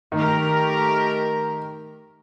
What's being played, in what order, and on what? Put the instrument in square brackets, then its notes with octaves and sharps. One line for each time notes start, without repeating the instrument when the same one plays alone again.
[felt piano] D#3 [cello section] A3 G4 A#4